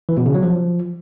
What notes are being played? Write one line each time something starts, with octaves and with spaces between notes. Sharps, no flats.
E3
B2
C#3
F#3
F3